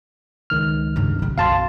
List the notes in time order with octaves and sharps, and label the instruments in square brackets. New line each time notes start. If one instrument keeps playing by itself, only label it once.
[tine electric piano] C#2 D#3 F6
[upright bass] G2 C#3
A1 C#4
[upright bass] B1 F#2 [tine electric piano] F5 A5 C6